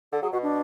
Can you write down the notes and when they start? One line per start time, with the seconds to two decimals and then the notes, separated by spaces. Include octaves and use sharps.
0.12 D3 A4
0.22 F#3 G#4
0.32 B2 F#4
0.43 D4